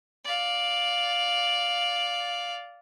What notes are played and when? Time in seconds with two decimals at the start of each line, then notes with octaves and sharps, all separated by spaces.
0.25 D5 F5